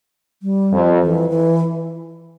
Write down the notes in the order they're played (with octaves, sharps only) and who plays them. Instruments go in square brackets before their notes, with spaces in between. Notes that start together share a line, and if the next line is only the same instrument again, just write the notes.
[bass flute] G3
[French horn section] F2
[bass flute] E3
E3